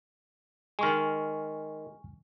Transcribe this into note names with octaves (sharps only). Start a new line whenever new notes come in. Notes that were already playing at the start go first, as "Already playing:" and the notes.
D#3 G#3 G#5 C#6 F6